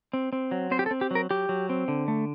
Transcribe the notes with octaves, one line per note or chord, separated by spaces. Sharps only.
C4
C4
F#3
C4 C5
G4
A4
C4
G4
F#3 A#4
F#3 G4
F#3
C4
D3
A3